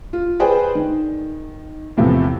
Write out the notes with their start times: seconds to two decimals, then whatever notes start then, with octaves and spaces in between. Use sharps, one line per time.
0.13 F4
0.40 G#4 B4 C5 D5 G5 G#5
0.75 D#3
1.97 E2 A2 C3 F3